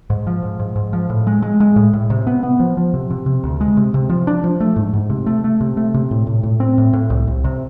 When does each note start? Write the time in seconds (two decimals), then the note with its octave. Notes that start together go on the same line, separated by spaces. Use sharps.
0.10 G#2
0.27 F3
0.43 G#2
0.59 G#2
0.76 G#2
0.93 F3
1.10 A2
1.27 G#3
1.42 G#3
1.60 G#3
1.76 A2
1.93 A2
2.10 C3
2.27 B3
2.43 B3
2.59 F3
2.77 F3
2.94 C3
3.10 C3
3.26 C3
3.44 D2
3.61 G#3
3.77 C3
3.94 C3
4.10 F3
4.27 D4
4.44 F3
4.60 A3
4.76 G#2
4.93 G#2
5.10 C3
5.26 A3
5.44 A3
5.61 C3
5.77 A3
5.94 C3
6.11 A2
6.27 A2
6.43 A2
6.60 C4
6.78 A2
6.93 A2
7.10 C2
7.27 C2
7.44 C3